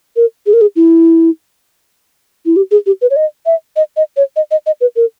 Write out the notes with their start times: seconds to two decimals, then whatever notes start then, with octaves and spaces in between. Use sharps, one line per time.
0.16 A#4
0.46 G#4
0.53 A#4
0.61 G#4
0.76 E4
2.46 E4
2.56 G4
2.71 G#4
2.86 G4
3.02 B4
3.10 C#5
3.16 D#5
3.46 E5
3.76 D#5
3.97 D#5
4.17 C#5
4.36 D#5
4.51 D#5
4.66 D#5
4.81 B4
4.96 A#4